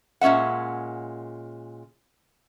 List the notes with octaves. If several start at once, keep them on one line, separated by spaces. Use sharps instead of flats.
A#2 G#3 C#4 E5 F#5